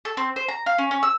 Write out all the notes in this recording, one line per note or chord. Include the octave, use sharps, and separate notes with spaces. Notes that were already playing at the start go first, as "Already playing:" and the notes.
A4
C4
C5
A#5
F5
C#4
C#4
E6